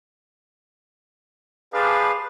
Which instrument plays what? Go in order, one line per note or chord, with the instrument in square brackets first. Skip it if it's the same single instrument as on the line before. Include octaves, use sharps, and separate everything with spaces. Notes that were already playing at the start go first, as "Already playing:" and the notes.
[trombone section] F3 G3 D4 [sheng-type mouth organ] G#4 B4 F5